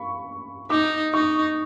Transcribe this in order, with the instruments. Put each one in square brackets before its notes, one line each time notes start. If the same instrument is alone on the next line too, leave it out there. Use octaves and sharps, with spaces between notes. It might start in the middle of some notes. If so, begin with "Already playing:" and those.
Already playing: [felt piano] F5 B5 C#6
[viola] D#4 [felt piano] D6
[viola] D#4 [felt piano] C#6